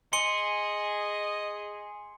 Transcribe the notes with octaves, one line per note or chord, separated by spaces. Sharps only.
G#4 D#5 C6 C#7 G7